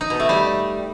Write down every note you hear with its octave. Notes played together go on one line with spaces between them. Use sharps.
D#4
B2
A3
G3